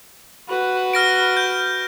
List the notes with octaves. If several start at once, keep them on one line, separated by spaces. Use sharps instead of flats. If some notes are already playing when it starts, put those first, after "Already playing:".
F#4 B4
F6 A#6 D7
G6